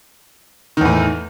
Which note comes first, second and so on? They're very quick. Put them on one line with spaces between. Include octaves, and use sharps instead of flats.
D#3 E2 A2